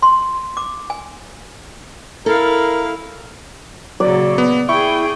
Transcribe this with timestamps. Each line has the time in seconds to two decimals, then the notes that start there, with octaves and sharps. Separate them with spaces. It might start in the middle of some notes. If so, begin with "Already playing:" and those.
0.02 C6
0.57 D6
0.90 G#5
2.26 E4 A4 A#4 F5
4.00 A#2 C#3 F#3 D5
4.38 B3
4.69 E4 G#4 G5 C#6